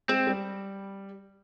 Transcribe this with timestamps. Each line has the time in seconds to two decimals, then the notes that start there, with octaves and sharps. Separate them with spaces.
0.09 G#3 C4
0.27 G3